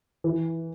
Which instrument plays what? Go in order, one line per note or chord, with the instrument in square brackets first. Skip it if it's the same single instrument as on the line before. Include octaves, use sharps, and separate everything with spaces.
[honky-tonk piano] E3